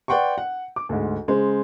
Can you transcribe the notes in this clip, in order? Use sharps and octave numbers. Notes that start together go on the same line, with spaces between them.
B4 D5 F#5 G5 C6 C#6
F#5
D6
D2 G#2
C#3 G#3 C5